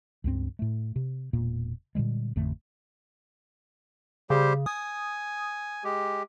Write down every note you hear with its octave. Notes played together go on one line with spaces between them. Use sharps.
C#2 G2 C4
A2 A3
C3
E1 A#2 A#3
A#2 D3 G3 G#3
A1 F2 D3 A3
C#3 G3 G4 C5
G#5 D#6
G#3 G4